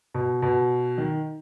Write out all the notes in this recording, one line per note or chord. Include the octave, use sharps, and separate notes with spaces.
B2
B2
D#3